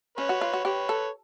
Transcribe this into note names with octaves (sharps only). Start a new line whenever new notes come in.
C#4 B4 C#5
F#4
F4
F#4
G4 B4 C#5
A4